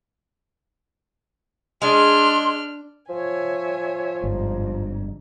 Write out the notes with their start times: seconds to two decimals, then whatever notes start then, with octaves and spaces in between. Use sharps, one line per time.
1.82 G#3 D4 C6 F6
3.09 F3 C#5 E5 G#5
4.24 G1 F2 G#2